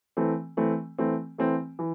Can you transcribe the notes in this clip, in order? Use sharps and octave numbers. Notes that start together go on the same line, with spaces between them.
E3 A3 C4
E3 A3 C4
E3 A3 C4
E3 A3 C4
E3